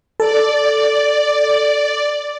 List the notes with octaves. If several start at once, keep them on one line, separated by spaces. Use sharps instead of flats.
A4 D5